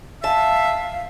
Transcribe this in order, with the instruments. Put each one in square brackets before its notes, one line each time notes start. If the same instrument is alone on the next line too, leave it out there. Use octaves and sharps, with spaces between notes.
[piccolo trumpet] E5 [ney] F5 [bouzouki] A5